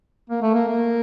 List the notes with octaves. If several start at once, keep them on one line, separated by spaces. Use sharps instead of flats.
A#3
A3
A#3
A#3